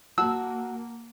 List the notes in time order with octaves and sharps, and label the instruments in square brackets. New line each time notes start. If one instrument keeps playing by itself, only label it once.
[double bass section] A#3 [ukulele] F#4 A5 [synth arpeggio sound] E6